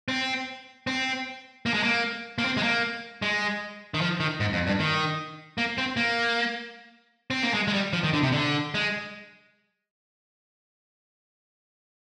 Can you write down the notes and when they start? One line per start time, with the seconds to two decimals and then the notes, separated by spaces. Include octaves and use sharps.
0.08 C4
0.87 C4
1.66 A#3
1.74 G#3
1.83 A#3
2.38 A#3
2.44 C4
2.57 G#3
2.63 A#3
3.22 G#3
3.94 D#3
4.01 F3
4.20 D#3
4.40 G#2
4.53 F2
4.67 G2
4.80 D#3
5.58 A#3
5.78 C4
5.97 A#3
7.30 C4
7.43 A#3
7.54 G#3
7.68 G#3
7.73 G3
7.93 F3
8.04 D#3
8.13 D3
8.23 C3
8.32 D3
8.74 G#3